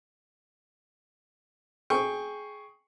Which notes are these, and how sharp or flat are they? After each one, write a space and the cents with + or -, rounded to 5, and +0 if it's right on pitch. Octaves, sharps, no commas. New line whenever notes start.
G#4 +15 G5 +15 C#6 +0